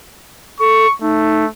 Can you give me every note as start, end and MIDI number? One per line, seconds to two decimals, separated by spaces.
0.60 0.86 69
0.60 0.94 85
1.01 1.48 57
1.01 1.45 63